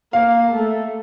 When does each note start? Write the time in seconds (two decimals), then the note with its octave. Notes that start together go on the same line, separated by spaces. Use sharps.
0.13 A#3 F5
0.52 A3